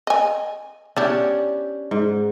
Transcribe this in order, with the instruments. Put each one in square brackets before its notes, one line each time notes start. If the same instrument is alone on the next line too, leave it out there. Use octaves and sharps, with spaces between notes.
[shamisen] D#5 G#5
[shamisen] B3 E4 [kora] C#4 D4 G4
[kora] G#2